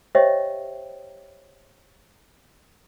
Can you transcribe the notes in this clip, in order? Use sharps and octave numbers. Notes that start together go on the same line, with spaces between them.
G4 C5 C#5 D#5 E5 G5